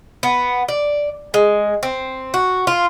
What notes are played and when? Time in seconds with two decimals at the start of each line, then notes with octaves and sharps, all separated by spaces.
0.23 B3
0.68 D5
1.34 G#3
1.83 C4
2.34 F#4
2.67 F4